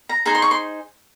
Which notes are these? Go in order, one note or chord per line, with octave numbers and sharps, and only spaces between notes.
A#5
D#4 G#4 C5 A#5
C6
C#6
C6